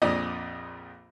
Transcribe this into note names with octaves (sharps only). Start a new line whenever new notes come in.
A#1 F2 A#2 D5 D#5